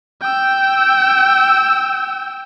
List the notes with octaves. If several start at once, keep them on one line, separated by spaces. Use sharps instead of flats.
G5 E6